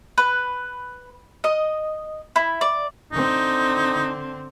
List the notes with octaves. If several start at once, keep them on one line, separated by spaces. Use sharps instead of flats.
B4
D#5
E4
D5
D3 C4 D#4